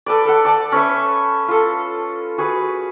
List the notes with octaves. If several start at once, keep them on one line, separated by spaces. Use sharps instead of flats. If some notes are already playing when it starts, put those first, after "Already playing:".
A4 B4 D5
A4 F#5
D5 A5
C#4 B4 E5
F4 A4
F#4 G#4 B4